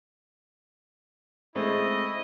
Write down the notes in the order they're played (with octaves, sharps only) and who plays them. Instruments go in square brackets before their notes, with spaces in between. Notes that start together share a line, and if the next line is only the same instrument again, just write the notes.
[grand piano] G#3 A3 C4 [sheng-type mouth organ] E4 [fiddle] D#5